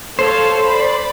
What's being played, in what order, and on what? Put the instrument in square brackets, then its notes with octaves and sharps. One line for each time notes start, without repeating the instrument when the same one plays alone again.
[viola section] A4 C#5 F5 [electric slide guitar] C5
[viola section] D5 B5